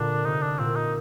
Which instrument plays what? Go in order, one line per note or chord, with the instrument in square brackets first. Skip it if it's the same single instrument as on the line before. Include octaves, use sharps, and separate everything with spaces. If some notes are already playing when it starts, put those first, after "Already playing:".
Already playing: [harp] A#2 D3 [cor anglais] D4
[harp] C3 [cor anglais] D#4
[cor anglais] D4
[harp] A#2 [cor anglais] C4
[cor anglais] D#4